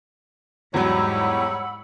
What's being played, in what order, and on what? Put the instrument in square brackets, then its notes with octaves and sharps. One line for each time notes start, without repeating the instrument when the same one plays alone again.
[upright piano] E2 F#3 [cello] G#2 [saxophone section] G3 C#5 [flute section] F#5 B5 E6